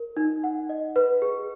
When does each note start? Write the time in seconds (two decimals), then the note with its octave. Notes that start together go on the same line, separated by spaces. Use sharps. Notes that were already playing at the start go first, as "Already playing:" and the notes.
Already playing: A#4
0.17 D#4
0.44 F#5
0.69 D#5
0.96 B4
1.22 G#4